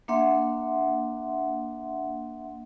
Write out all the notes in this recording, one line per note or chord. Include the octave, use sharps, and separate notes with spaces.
A#3 D4 E5 F#5 C6